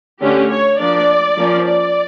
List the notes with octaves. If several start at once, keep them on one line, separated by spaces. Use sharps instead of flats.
D3 A3 C#4 G4
C#5
F3 A#3 D4 D5
F3 A#3 C#4
D5